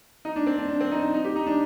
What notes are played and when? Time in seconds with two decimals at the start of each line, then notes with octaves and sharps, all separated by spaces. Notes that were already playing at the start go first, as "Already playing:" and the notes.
0.25 D#4
0.36 D4
0.47 C4
0.58 D4
0.69 D4
0.81 C4
0.91 D#4
1.03 D#4
1.14 D#4
1.24 G4
1.36 D#4
1.47 D4